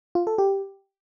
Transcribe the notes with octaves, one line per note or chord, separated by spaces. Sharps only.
F4
A4
G4